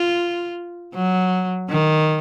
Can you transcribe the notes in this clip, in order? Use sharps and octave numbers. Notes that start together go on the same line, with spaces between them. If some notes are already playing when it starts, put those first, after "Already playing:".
Already playing: F4
F#3
D#3